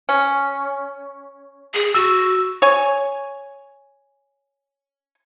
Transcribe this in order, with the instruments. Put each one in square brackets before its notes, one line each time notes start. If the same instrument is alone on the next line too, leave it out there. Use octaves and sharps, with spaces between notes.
[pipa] C#4
[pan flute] G#4
[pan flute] F#4 [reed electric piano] E6
[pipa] C#5 G#5